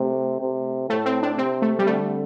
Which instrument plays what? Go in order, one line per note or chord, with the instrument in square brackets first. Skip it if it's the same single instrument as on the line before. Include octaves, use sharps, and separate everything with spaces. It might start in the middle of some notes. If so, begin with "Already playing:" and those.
Already playing: [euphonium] C3 [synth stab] A3
[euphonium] C3
[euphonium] A2 [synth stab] A3
[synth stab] C4
D4
[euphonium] C3 [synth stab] C4
[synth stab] A3
G3
[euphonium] D3 [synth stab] A3